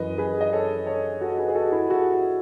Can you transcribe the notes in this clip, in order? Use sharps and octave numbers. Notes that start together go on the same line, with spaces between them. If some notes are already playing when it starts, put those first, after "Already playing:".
Already playing: F#2 E3 B4 D#5
G#4 B4
D#5
A4 C#5
A4 C#5
F#4 A4
G#4 B4
G#4
F#4 A4
E4 G#4
F#4 A4